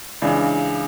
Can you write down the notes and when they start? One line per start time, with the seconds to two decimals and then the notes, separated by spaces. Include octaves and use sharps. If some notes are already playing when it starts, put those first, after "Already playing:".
0.22 C#2 C#3 E3 D4